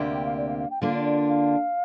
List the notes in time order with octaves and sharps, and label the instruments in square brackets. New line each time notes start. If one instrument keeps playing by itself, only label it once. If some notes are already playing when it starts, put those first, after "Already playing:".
Already playing: [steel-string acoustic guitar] D2 C3 A#3 G4
[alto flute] G5
F5
D5
F5
F5
G5
[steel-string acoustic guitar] D3 A#3 D4 F4 [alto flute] F5
[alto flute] D5
D5
F5